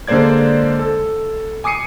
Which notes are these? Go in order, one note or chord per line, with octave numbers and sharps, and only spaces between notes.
D3 G#3 A#3 C5 D5 G#6
A4
G#5 D6 D#6 C7 C#7 D#7